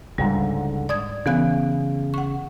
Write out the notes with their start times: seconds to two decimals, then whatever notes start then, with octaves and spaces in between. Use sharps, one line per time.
0.18 C#2 G#2 D3 G3
0.89 D5 D#6 G#6
1.26 C#3 E3 B3 F#6
2.14 F#5 C#6